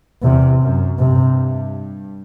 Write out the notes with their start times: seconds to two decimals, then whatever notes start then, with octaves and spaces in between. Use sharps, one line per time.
0.23 E2 C3
0.61 F#2
0.99 G2 C3